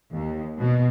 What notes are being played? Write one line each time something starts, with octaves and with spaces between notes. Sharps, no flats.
D#2
B2